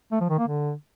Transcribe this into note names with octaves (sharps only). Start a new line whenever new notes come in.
A3
F3
D#3
A#3
D3